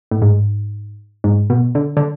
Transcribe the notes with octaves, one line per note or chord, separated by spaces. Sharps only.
A2
G#2
G#2
B2
D3
D3